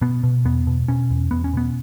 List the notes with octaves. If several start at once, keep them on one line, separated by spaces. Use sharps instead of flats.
B2 B3
B2
E2 B3
B2
B2 C#4
E2
E2 B3
C#4
B2 B3